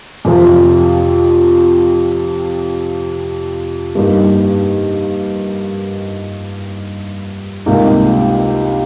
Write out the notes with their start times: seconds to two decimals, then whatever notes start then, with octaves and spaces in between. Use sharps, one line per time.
0.25 F2 C3 F3
3.95 G2 G3 A#3 D#4
7.66 C#2 C3 G3 A#3 D#4